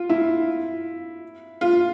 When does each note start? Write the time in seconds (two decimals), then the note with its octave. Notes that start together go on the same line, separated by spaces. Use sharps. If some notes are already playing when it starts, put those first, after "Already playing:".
Already playing: F4
0.09 E4
1.61 F4